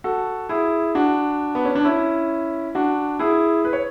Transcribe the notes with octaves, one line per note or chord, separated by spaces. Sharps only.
F#4 A4
E4 G#4
D4 F#4
B3
C#4
D4
C#4 E4
D4 F#4
E4 G#4
B4
C#5